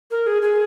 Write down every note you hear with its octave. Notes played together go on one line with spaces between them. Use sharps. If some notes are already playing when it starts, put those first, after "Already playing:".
A#4
G#4
G#4